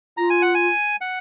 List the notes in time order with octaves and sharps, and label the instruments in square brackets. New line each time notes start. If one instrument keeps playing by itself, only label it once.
[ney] F4 [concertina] A#5
[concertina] G#5
F#5
G#5
F#5